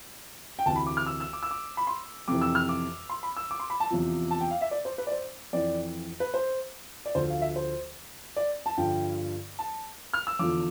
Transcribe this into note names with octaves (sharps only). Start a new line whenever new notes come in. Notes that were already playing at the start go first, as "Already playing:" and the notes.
G5
D2 C3 E3 A5
B5
D6
F6
E6
E6
D6
E6
D6
B5
C6
F2 C3 E3 D6
E6
F6
D6
C6
B5
E6
D6
C6
B5
A5
E2 C3 F3
A5
G5
F5
E5
D5
C5
B4
D5
C5
F2 E3 D5
B4
C5
D5
D2 D3 F3 C5
F5
E5
C5
D5
A5
G2 D3 F3 G5
A5
F6
E6
E2 D3 F3 D6